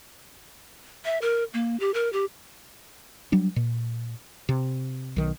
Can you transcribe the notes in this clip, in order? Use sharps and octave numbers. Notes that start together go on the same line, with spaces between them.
E5
A#4
A#3
G4
A#4
G4
F#3 G3 D4
A#2
C3
B1 D#3